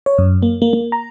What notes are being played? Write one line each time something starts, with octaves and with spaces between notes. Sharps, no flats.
C#5
F#2
A#3
A#3
A#3
A#5